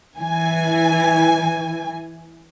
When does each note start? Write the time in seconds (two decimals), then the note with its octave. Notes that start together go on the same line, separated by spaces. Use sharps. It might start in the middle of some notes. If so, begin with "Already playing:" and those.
0.19 E3 G#5